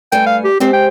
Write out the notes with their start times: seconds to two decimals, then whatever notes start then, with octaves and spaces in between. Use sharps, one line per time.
0.12 G2 A3 G5 G#5
0.27 F5
0.44 G4
0.60 G#3 C4 G4 C5
0.73 G5